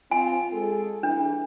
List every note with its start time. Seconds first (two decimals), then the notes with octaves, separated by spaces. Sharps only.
0.11 C4 F4 G#5
0.53 G#3 G#4 A4
1.03 E3 D4